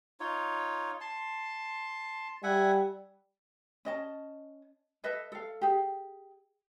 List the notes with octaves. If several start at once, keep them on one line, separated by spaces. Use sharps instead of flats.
D#4 F4 C#5
A5 C6
G3 E5 F#5 G#5
C#4 D#5 A5
A4 B4 D#5 E5
A4 F5
G4 G#4